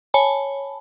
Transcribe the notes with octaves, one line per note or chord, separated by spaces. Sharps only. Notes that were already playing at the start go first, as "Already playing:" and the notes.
C#5 G#5 A5 B5